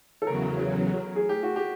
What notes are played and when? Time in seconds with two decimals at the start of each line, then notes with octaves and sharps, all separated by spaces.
0.22 A4
0.27 E2 C#3 F#3 A#4
1.16 G#4
1.29 G4
1.43 F#4
1.56 G4